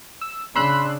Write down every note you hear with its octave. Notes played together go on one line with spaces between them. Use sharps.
E6
C#3 D4 B5 C6 E6 F#6